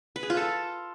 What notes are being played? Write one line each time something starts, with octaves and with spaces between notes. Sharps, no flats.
B4
G#4
F4
A4